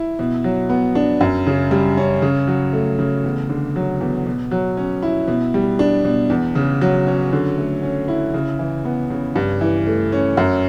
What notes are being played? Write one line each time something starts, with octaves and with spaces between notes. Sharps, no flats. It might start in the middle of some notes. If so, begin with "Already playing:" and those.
Already playing: E4
B2
F#3
B3
D4
F#2
C#3
G3
C#4
C#3
F#3
A3
C#3
E2
D3
F#3
E2
B2
F#3
C#4
E4
B2
G3
D4
B2
E2
C#3
F#3
C#4
D3
A3
C#4
E4
C#3
E3
B3
C#3
G2
E3
A3
C#4
F#2